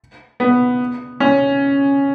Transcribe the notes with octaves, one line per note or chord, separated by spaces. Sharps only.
B3
C#4